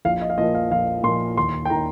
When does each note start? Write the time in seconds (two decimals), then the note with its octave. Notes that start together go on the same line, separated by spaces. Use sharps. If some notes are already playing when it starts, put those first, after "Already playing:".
0.05 A#1 F5
0.21 D#5
0.30 F5
0.38 A#2 F3 A#3 D#5
0.55 F5
0.71 A#1 F5
1.03 A#2 F3 A#3 C6
1.37 D#2 C6
1.65 G5
1.70 D#3 A#3 A#5